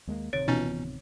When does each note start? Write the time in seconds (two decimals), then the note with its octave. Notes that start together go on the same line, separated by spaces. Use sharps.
0.07 D#2 G#3 A#3
0.33 D1 C3 D#3 C#5 A6 D7
0.48 B2 E3 B3 C#4 D#4 F4 A6